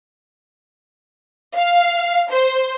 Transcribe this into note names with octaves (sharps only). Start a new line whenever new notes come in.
F5
C5